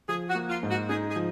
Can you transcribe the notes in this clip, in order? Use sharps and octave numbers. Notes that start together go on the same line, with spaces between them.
F3 G#4
F#4
A#3
F4
G#2
F#4
D#4 G#4
G#4
F3